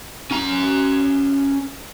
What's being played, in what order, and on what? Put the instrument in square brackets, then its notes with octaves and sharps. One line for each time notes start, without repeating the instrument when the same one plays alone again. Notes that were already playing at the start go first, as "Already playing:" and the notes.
[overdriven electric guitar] C#4 A#5